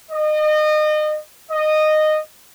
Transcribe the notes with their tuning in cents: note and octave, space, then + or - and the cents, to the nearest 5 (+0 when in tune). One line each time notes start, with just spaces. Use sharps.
D#5 -30
D#5 -15